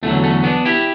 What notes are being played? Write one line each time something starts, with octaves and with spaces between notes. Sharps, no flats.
E2 D3 F#3 A3
A3 C#4
B3 D4
E4 G4